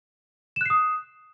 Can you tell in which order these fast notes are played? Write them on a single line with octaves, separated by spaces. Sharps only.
E7 F#6 C7 D#6